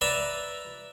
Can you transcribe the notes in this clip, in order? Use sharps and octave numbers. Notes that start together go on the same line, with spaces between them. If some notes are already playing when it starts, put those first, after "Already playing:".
B4 D5 E5 A#5 B5